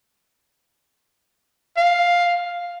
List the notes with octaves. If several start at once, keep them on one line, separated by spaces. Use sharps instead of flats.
F5